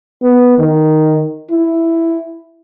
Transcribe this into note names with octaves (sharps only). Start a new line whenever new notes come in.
B3
D#3
E4